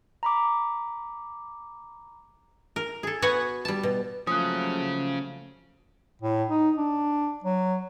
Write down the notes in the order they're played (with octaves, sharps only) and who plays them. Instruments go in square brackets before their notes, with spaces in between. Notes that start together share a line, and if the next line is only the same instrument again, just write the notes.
[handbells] A#5 B5 D6
[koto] A#4
G#4 A4
B3 F#4 B4 C#5 F#5 G#5
G3 A5
B2
[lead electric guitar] C#3 C#4 [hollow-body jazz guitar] F3 [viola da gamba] F#3 A3 A#3 [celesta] D#6 F#6
[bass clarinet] A2
D#4
D4
F#3